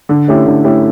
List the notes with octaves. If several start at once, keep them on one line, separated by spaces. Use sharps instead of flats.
D3
A3 C#4 E4 G4
D3
A3 C#4 E4 G4